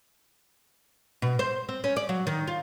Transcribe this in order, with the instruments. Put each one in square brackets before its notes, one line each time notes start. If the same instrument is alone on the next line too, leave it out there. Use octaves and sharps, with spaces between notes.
[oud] B2
C5
C4
C#4
D5
F#3
D#3
F4